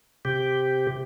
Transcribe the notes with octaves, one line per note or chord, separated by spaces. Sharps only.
C3 G4